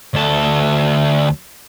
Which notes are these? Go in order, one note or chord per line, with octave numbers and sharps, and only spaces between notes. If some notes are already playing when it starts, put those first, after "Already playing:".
D2 A4